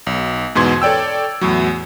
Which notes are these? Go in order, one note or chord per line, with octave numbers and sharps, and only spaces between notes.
B1
E2 G#2 B2 C6 G#6
A4 C#5 D5 G5 E6
E2 A2 F#3